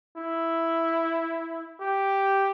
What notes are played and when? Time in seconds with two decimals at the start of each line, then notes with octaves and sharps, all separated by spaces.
0.17 E4
1.81 G4